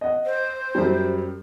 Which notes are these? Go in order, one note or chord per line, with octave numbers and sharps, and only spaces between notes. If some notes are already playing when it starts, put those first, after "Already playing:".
D#5 F#5
C5
F#2 G3